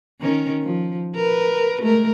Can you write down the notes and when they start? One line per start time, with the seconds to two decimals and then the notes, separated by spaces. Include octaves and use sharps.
0.20 D#3 C#4 A#4
0.62 F3
1.15 A#4 B4
1.80 G#3 A3 A#4